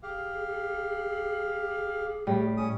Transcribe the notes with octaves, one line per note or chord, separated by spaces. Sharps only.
G4 G#4 F5
A2 G3
C#4 D#6